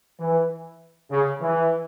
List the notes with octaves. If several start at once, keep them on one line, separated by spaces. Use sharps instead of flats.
E3
C#3
E3